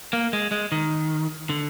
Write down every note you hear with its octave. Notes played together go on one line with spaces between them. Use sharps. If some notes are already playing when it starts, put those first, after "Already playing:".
A#3
G#3
G#3
D#3
D3